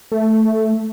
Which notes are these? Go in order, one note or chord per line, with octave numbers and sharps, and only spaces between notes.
A3